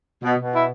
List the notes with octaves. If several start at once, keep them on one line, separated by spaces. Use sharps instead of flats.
B2
B2
E4